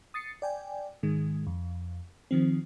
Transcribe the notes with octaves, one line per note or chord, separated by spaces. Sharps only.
D#6 A6 C7 C#7
D5 G5 G#5
G#2 D#3 G#3
F2
D#3 F3 C4